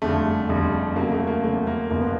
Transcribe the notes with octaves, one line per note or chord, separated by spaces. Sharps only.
F#1 F2 D3 G3 A3
F#1 F2 D3 G3
E2 C#3 F#3 A#3
A3
A#3
E2 C#3 F#3 A3
A#3
G1 F2 C3 A#3
B3